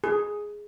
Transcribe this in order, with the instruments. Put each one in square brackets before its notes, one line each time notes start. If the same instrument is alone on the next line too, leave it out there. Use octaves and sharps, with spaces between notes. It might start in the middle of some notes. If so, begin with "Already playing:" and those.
[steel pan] G#4